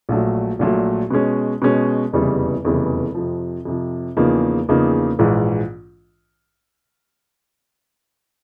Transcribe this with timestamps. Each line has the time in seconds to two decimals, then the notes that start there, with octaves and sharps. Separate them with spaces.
0.09 A#1 A#2 F#3 A3
0.59 A#1 A#2 F#3 A3
1.10 B2 G#3 C#4
1.62 B2 G#3 C#4
2.13 F1 E2 C#3 E3 G3
2.65 F1 E2 C#3 E3 G3
3.15 F2 C3 F3
3.65 F2 C3 F3
4.17 E2 C#3 F3 A#3 D#4
4.69 E2 C#3 F3 A#3 D#4
5.19 A#1 G#2 E3